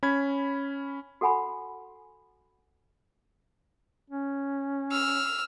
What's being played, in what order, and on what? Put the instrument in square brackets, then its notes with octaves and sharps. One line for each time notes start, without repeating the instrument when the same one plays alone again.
[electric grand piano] C#4 B5 G#6
[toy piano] F#4 A4 F#5 G#5 B5
[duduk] C#4
[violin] E6 F6